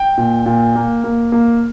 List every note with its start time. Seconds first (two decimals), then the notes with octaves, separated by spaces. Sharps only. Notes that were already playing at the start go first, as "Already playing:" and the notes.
Already playing: G5
0.17 A#2
0.46 A#2
0.76 A#3
1.04 A#3
1.32 A#3